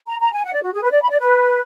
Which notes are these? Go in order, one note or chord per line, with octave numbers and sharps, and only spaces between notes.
A#5
A#5
G#5
F#5
D5
F#4
G#4
B4
D5
B5
D5
B4